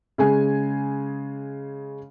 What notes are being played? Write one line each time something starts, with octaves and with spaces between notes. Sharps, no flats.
C#3 G#3 G#5